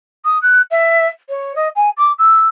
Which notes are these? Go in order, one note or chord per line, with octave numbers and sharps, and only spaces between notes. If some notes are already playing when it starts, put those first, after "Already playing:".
D#6
F#6
E5
C#5
D#5
G#5
D6
E6